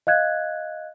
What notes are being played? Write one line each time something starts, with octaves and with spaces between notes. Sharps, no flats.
D#5 F5 F#6 G#6